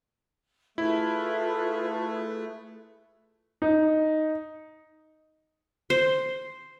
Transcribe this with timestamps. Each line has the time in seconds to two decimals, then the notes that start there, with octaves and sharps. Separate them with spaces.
0.78 A3 E4 F4 G#4 B4
3.62 D#4
5.90 C5